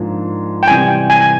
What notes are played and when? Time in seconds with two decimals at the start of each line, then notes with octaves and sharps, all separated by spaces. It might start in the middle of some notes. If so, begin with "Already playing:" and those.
Already playing: G#2 F3 A#3 D4
0.63 G5
0.67 C3 E3 G3 G#5
0.88 G5
1.10 G#5
1.21 G#5